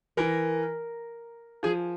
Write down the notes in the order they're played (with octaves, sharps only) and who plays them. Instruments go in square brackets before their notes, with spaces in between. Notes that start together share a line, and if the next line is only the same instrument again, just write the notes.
[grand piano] E3 [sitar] A#4
[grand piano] F3 [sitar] G#4